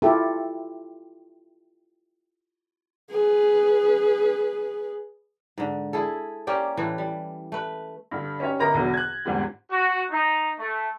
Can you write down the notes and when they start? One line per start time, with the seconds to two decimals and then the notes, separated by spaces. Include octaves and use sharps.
0.02 E4 F4 G4 A4
3.11 G#4 B4
5.58 G#2 D3
5.93 E4 G#4 A4
6.47 A#3 C#4 G4 D5
6.77 A2 E3 A3
6.98 G3
7.52 A3 B4
8.11 G2 D3
8.40 C#4 D#4 G4 C#5
8.60 G1 A#4 D#5 A#5 A#6
8.74 B1 E2 D3 F#3
8.94 F#6 G#6
9.25 E2 G#2 D3 F3 G3 C4
9.70 F#4
10.11 D#4
10.59 A3